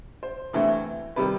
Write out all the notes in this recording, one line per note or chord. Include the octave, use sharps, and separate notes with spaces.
C5
D2 C3 E3 A3
C3 D#3 G3 B4